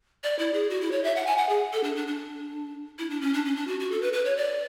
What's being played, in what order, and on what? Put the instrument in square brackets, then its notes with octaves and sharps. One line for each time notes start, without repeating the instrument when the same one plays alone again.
[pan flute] D5
E4
G#4
F#4
E4
C#5
E5
F#5
G#5
F#5
G#4
A4
D4
D4
D4
E4
D4
C#4
D4
C#4
D4
F#4
F#4
A4
B4
B4
C#5
D5